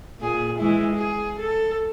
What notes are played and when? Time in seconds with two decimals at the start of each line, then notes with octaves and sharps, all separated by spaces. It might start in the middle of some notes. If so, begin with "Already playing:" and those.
0.20 A#2 G#4
0.59 E3 G#3 E4
0.95 G#4
1.39 A4